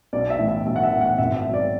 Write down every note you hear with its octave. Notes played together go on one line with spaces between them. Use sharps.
B1 D5
E5
A2 E3
E5
B1 E5
F#5
E5
A2 E3
F#5
G#1 E5
E5
G#2 F#3
D5